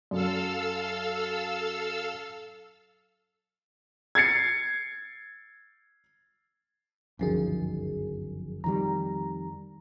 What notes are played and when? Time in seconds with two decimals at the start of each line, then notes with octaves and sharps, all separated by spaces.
0.11 F#2 A4 F5 E6
4.15 G#6 A6 C7 C#7
7.19 G1 C#2 F#2 D#3 F3 G#4
8.64 F2 D#3 G3 A#5